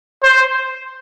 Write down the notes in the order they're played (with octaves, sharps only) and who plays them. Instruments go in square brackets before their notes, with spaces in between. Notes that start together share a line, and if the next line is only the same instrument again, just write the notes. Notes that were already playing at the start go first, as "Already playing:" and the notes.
[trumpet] C5